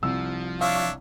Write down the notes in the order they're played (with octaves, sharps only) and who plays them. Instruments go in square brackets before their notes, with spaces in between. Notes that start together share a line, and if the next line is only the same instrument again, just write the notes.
[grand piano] C2 E6 [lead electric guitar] F3
[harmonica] D4 C#5 E5 [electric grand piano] F5